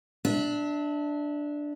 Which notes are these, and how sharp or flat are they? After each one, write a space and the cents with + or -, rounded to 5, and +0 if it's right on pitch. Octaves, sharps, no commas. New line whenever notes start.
D4 +0 E5 -30